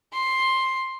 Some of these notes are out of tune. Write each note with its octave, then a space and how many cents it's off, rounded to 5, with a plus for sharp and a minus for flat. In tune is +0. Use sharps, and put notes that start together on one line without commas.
C6 +10